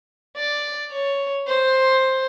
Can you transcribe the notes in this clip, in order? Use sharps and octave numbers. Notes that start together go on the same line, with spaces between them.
D5
C#5
C5